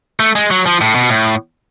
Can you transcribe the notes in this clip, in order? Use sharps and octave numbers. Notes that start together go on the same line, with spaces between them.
A3
G#3
F#3
F3
A2
B2
A2